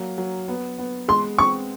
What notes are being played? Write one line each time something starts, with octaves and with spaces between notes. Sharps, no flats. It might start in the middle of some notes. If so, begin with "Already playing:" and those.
Already playing: F#3 A#3
F#3
B3
B3
G#3 C6
C4 C#6